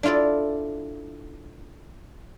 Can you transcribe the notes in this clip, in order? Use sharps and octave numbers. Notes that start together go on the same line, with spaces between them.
D4 E4 F4 A4 D5